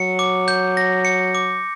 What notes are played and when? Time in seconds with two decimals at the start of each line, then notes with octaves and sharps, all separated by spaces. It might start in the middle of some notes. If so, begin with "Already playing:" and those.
Already playing: F#3 C#7
0.19 D6
0.48 G6
0.77 A#6
1.05 C#7
1.35 D6